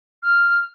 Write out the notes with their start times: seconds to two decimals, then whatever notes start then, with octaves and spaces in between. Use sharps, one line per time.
0.23 F6